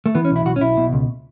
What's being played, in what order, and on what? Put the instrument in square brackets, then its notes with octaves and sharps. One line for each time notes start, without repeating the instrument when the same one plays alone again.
[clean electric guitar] A3
E3 B3
C#4
B1
E4
B1 F#4
C#4
B1 E4
B2
C#2